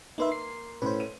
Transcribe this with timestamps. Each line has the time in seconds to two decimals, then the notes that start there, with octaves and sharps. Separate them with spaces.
0.18 A#3 D#4 B4 E5 C6
0.32 C7
0.82 A2 C#4 B4 C5
1.00 D#7